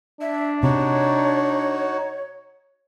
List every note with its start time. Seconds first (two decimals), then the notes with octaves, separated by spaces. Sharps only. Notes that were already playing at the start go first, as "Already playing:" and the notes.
0.21 D4 E5
0.63 C3 D#4 F#4 C#5